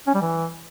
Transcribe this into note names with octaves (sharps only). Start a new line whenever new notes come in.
C#4
G3
E3